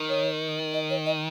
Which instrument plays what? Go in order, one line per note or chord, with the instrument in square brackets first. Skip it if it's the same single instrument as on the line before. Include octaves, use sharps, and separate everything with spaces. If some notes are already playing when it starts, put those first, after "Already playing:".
Already playing: [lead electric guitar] D#3
[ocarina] C#5
D#5
C#5
D#5